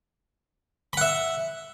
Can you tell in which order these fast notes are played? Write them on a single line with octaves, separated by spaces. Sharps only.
B5 F#5 E5